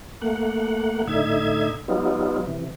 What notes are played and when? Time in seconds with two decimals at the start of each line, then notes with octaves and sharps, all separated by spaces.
0.22 A3 A#3 F#5
1.07 A2 D3 D#4 E5 G#6
1.88 F#3 G3 B3 D#4 F4
2.47 C3 E3